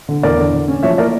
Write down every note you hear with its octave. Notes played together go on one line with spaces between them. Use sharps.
D3
E2 A#4 D5
D3
D3
C#4
F3 C#5 E5
A#3 A#4 D5